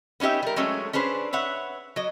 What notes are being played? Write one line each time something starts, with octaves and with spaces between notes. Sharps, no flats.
B3 C#4 D#4 G4 E5
G3 A#4
F#3 G#3 A3 C#4 A4
C#4 D4 G#4 B4 C5
B4 C#5 E5 F#5
F#3 D#5